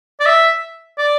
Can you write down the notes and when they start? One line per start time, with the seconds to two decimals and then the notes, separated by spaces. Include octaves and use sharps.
0.20 D5
0.26 E5
0.98 D5